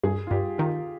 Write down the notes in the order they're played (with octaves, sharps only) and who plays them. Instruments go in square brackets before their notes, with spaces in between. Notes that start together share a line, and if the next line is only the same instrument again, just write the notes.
[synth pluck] G2 [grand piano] G#4
[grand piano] F4
[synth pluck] G2 [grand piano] G4
[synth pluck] D#3 [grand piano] F4